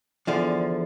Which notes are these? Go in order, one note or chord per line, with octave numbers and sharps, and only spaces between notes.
E2 D3 F3